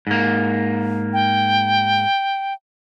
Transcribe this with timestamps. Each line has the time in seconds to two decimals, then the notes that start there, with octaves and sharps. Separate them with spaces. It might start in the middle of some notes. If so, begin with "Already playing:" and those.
0.07 G#2 A#3
1.13 G5